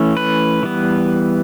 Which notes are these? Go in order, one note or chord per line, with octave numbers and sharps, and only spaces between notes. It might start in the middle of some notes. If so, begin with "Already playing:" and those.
Already playing: E3 A3 C#4
B4
E3 G3 B3